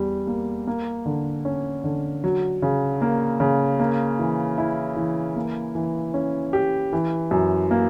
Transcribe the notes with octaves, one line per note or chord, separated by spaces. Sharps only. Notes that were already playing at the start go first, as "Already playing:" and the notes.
Already playing: E2 G3
A#3
A#3
D3
C#4
D3
F#3
C#3
A#3
C#3
A#3
E3
E4
E3
A#3
E3
C#4
G4
E3
F#2
A#3